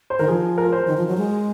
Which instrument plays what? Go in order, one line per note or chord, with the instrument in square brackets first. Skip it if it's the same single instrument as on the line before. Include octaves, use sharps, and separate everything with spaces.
[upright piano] C5
[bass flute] D#3 [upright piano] A#4
[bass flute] F3 [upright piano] G#4
[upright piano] A#4
C5
[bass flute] D#3
F3
F#3
G#3